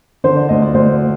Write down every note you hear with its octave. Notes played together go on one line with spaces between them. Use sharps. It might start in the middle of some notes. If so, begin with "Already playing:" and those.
D3 C5
D5
D2 D#5
D5
D2 C5